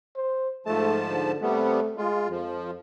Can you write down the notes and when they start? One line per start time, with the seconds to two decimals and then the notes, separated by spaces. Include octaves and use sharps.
0.16 C5
0.66 G#2 F3 A3 A5
1.09 D3
1.41 C3 G3 A3 B3
1.97 G#3 F4
2.30 F2 F3